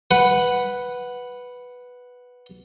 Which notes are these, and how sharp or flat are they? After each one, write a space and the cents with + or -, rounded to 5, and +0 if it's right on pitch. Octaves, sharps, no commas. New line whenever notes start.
B4 +0 F#5 +0